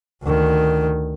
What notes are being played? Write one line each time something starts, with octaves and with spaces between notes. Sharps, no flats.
D2 D#3